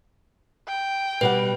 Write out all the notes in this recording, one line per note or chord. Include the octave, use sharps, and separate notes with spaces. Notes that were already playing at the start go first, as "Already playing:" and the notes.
G5
B2 G3 B4 F#5